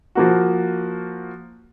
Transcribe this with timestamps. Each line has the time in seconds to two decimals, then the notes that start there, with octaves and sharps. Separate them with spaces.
0.15 F3 A#3 F#4